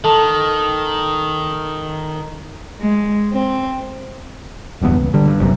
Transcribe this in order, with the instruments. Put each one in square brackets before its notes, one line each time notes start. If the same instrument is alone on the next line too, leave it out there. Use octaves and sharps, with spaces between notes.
[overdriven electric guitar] D#3 [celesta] A4 A5
[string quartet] G#3
C4
[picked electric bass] D1 E2 G2 B3
C#2
D3 G3
G2
F#1 F#2 C3